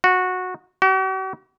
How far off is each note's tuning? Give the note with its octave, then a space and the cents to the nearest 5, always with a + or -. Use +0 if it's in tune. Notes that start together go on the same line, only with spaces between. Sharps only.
F#4 -15
F#4 +45